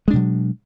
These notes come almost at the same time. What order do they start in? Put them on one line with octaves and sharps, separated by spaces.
G#3 D4 B2 F#3